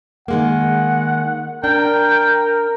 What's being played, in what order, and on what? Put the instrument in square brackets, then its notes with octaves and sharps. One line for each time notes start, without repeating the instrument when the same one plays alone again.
[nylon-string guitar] D#3 G#3 A#3 [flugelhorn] F#5
[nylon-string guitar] D4 [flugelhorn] A#4 [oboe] G5